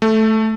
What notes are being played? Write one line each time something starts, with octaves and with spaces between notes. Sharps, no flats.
A3